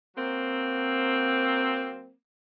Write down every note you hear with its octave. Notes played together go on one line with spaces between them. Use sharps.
F#3 A#3 C4